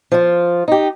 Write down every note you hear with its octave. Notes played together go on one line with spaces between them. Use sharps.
F3 F4
D#4 G4